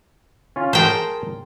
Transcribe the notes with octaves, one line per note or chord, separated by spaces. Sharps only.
C#4 F4
G#4 A#4 C5 G5 A5